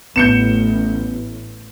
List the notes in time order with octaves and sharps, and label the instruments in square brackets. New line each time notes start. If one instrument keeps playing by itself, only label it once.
[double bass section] A1 [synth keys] B3 [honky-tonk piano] G6 C#7 E7